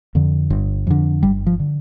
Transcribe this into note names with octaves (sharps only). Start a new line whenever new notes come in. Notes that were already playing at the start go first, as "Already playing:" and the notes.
F2 D3
G1
F2 D3
G1 G3
F3
D3